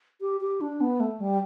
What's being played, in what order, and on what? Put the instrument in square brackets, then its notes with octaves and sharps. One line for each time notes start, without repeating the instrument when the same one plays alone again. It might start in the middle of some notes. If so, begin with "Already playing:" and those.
[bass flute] G4
G4
D4
B3
A3
G3